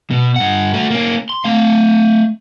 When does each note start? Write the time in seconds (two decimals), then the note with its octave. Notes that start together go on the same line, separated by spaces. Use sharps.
0.11 B2
0.36 G2 F#5
0.74 A3 F#4
0.91 A#3 C#4
1.30 C6
1.44 A3 F5